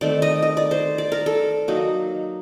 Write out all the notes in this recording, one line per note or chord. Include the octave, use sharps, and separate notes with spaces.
D#3 A3 C4 D5
D#5
D#5
D5
C5
D5
A#4
A4
F#3 A#3 D#4